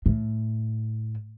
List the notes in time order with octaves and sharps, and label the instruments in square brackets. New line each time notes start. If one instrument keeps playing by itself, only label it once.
[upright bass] A2